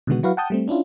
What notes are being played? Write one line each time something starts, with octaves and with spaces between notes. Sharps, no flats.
B2 D3 D#3 G#3 B3 F#4
F#3 E4 F#4 B4 F5
F#5 G5 A5 D#6 G6
G3 A3 C4
C#4 D4 E4 F4